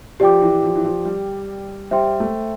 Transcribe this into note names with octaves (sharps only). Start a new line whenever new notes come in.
F3 G4 D5 G5 D6
E3
F3
E3
F3
G3
G3 C5 E5 G5 C6
A3